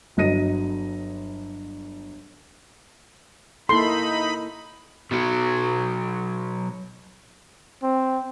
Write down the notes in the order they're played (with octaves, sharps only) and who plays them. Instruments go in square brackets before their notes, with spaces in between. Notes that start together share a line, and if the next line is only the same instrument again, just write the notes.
[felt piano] G1 F#3 D#5 A#6 D#7
[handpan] A#3 E4 A4 [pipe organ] D#4 B5 [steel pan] C6
[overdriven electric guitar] B2 F#3
[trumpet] C4